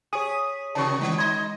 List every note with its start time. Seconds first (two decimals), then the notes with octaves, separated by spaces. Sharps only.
0.13 G#4 C#5 G#5 D#6 B6
0.75 C3 D#3 F#3 D5 A5 C#6
1.01 D#3 G#3
1.18 D#4 D#5 C6 G#6